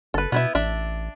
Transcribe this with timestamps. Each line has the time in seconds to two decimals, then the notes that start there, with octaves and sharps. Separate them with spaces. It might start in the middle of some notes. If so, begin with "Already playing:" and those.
0.14 F#1 A4 B4
0.32 B2 B3 E4 E5
0.55 A1 D4 E5